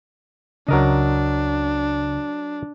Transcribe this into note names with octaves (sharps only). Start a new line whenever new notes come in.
C#2 C#3 F#3 D4 A#4 D#5